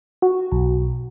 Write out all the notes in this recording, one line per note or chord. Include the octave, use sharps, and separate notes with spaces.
F#4
B1